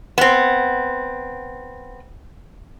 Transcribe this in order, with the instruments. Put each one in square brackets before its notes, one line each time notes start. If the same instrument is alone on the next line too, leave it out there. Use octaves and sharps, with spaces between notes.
[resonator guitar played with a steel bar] B3 C4